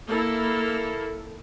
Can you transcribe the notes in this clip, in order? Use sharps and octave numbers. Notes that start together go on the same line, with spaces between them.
A#3 E4 A4